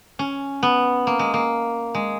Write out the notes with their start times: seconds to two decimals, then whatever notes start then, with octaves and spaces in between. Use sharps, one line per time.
0.19 C#4
0.63 B3
1.07 A#3
1.19 G#3
1.34 A#3
1.95 G#3